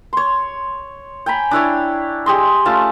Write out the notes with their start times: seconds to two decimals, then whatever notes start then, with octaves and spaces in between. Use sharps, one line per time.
0.13 C#5 C6
1.26 G5 G#5 A#5 B5
1.51 D4 E4 C#5 D5
2.26 G4 G#4 D#5 C6
2.65 A3 C#4 F4 A5